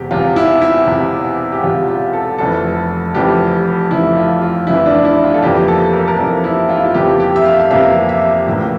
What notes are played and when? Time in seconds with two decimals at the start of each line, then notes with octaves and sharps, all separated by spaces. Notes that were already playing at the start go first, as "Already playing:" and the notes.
Already playing: E1 E2 C3 G4
0.11 E1 E2 C3 F4
0.36 E4
0.62 E4
0.87 E1 E2 C3
1.52 G4
1.63 E1 E2 C3 F4
1.88 F4
2.13 A4
2.38 F1 F2 E3 A4
3.15 F1 F2 E3 G4
3.91 F1 F2 E3 E4
4.17 F4
4.42 F4
4.67 F1 F2 E3 E4
4.86 D4
5.05 E4
5.24 F4
5.34 A4
5.42 F2 C3 E3 A#3 G4
5.68 A4
5.93 A#4
6.08 A#4
6.19 F2 C3 E3 A#3 A4
6.44 E4
6.69 F4
6.78 E4
6.86 F4
6.94 F2 C3 E3 A#3 G4
7.20 G4
7.36 E5
7.45 F5
7.60 F5
7.70 F2 C3 E3 A#3 E5
8.09 E5
8.46 A#1 A2 E3 A#3